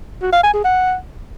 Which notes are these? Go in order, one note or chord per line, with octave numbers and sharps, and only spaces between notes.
F#4
F5
G#5
G#4
F#5